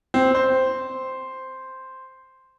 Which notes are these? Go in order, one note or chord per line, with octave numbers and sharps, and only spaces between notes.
C4
C5